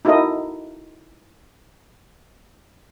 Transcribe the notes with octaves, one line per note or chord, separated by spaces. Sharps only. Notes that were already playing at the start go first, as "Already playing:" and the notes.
D#4 E4 F#4 A4 A#4 D#5